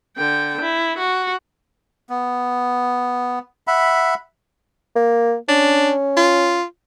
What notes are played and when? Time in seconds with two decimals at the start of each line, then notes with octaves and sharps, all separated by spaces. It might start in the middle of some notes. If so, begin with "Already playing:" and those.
0.17 D3 G5
0.61 E4
0.98 F#4
2.09 B3
3.67 E5 F#5 B5
4.96 A#3
5.48 C#4 D4
6.17 F4